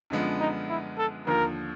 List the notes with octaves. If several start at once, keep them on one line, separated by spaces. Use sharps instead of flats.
F#2 D3 F3 G#3 B3
D#4
E4
A4
D#2 D3 F3 A#4